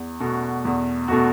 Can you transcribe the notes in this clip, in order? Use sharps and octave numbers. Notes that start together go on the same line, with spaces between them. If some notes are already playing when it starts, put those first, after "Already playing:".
Already playing: E2
B2 A3 F#4
E2
B2 A3 F#4